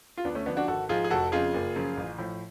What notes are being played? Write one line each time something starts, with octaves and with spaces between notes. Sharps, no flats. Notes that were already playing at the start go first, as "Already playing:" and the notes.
F4
D2 B3 D4
A3 C#4
D3 F3 B3 D4
D4 F#4
G#1 F#4 A4
G#2 F3 F4 G#4
G#4
F1 F#4 A4
F2 C#3 F4 G#4
F#1
F#2 C#3 F3
A1
A2 F3